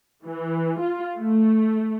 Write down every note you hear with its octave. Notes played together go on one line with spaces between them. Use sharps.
E3
F4
A3